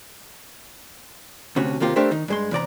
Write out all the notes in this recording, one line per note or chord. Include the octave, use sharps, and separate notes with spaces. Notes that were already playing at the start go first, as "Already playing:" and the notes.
D2 C3 C#4 F#4
D#2 C3 A#3 F4 G4
A3 D4 G4 A#4 C5 E5
D#3 D#4
G2 G#3 C6
E2 C3 D5 A#5